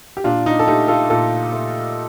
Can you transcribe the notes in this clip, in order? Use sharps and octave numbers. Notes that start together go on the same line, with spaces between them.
G4
A#2 D4 F4
D#4
A4
A3 D#4 G4
F4 A4
A#2 F4 A4
A3